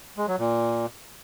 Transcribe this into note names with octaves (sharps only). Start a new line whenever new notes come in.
G#3
F#3
A#2